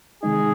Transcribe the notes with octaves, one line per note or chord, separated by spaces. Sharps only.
C3 D#3 G#3 D#4 G#4